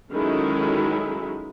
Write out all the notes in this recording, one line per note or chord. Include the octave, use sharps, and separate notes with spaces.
D#3 F#3 G#3 C#4 E4 A4